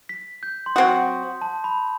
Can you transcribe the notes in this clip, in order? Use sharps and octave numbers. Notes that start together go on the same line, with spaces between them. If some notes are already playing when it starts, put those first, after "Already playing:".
B6
G6
C6
F#3 C4 F#4 D#6
A5
B5